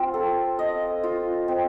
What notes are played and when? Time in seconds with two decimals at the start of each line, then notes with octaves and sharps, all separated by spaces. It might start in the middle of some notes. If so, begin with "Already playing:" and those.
Already playing: C4 F4
0.14 A4
0.59 D#5
1.04 F4
1.48 C4